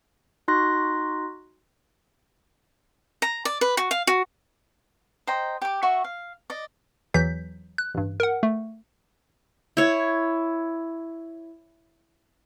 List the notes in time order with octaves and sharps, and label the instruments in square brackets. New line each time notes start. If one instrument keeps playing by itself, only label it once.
[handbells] D#4 F#4 C6 F#6 A#6
[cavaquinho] A#5
D5
B4
F#4
F5
F#4
C5 D#5 G5 A#5
G4 D6
F#4 E5 C#6
F5
D5 D#5
[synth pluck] E2 E3 F#3 G6 B6
F#6
A1 G2
A#4 F#5
A3
[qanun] E4 C#5